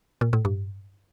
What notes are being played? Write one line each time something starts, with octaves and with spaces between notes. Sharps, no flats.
A#2
A2
G2